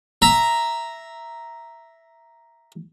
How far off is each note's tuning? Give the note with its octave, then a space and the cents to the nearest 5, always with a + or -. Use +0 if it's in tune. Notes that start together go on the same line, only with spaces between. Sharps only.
E5 +0 A#5 +0